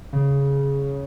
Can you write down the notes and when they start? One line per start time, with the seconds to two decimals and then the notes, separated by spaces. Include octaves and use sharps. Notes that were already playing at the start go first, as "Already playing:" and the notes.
0.13 C#3